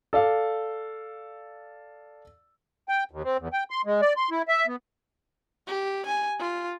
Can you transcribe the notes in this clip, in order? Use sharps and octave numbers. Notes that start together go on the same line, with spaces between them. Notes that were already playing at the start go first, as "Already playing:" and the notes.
A4 D5 F5
G5
D#2
C4
E2
G5
C6
G#3
D5
C6
E4
E5
B3
G4
G#5
F4